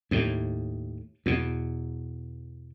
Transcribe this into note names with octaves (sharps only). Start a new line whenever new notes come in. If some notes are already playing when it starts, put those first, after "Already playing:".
D#2 A2
E2 B2